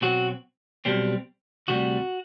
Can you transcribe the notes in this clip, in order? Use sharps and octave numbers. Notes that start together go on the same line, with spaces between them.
B2 F#3 C4 F#4
B1 B2 G3 C4
D2 C3 G3 F#4